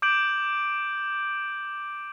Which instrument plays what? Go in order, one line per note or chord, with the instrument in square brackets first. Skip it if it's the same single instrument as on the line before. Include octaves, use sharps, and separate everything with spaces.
[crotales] D6 G6 D7 F#7